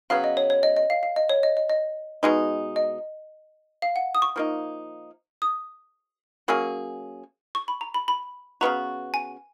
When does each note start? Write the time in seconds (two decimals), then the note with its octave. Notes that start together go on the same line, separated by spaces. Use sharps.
0.10 C#3 F#3 B3 F5
0.24 D#5
0.37 C#5
0.50 C#5
0.63 D#5
0.77 D#5
0.90 F5
1.03 F5
1.16 D#5
1.29 C#5
1.43 D#5
1.57 D#5
1.70 D#5
2.23 B2 G#3 D#4
2.76 D#5
3.82 F5
3.96 F#5
4.15 D#6
4.22 C#6
4.36 F3 A#3 D#4
5.42 D#6
6.48 F#3 A#3 C#4 G#4
7.55 C#6
7.68 B5
7.81 A#5
7.94 B5
8.08 B5
8.61 C#3 F#3 B3 F#4 A#5
9.14 G#5